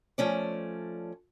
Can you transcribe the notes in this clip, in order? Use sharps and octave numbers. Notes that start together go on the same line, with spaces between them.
F3 A3 C#4 D5